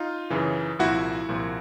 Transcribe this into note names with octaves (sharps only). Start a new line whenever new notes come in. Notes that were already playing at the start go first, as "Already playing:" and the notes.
Already playing: D#4 F4
F#2 C#3 E3
C2 A#2 F3 E4 F#4
C2 A#2 F3